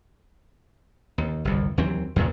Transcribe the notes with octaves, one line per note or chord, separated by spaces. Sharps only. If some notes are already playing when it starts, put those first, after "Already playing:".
D#2
G1 C2 F2
D#2 E3 F#3 C4
E2 G2 A#2 C#3